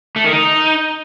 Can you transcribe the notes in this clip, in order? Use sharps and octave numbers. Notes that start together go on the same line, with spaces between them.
A3
D#3
D#4